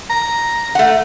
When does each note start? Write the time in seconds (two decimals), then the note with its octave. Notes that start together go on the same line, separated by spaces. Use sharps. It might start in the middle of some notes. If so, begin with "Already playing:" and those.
0.10 A#5
0.75 A3 F#5